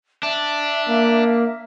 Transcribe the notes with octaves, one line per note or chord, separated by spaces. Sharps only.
D4 E5
A#3